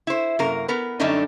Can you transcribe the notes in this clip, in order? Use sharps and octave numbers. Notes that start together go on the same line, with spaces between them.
E4 C5
F#2 C3 A#3 A#4
B3 A#4 B4
F#2 D3 G3 A3 D4 D#4